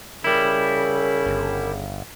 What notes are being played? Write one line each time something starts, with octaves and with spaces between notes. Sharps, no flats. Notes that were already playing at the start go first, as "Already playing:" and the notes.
C#3 G3 E4 A#4
G1